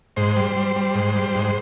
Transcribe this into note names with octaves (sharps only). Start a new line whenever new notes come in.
G#2 C5
G3
G3
G3
G#2
G3
G#2